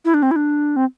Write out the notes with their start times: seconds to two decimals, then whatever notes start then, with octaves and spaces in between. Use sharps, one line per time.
0.05 E4
0.14 D4
0.23 C4
0.31 E4
0.36 D4
0.76 C4